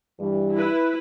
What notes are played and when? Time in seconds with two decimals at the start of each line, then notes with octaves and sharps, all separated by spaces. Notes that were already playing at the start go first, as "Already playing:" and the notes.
0.20 G2 E3 G3
0.54 E4 B4